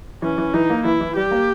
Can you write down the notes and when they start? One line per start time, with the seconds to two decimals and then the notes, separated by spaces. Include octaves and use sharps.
0.22 E3 C#4
0.38 E3
0.54 E3 D#4
0.70 A#3
0.85 E3 E4
1.01 E3
1.16 G3 G4
1.31 A#3